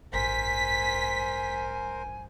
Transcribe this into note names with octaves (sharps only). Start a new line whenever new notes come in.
A1 G2 A#4 C5 G#5 B6